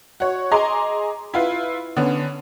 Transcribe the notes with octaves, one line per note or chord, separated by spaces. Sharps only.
F#4 C#5
G#4 D#5 A#5 C6 D6
E4 F4 B4
D3 B3 C#4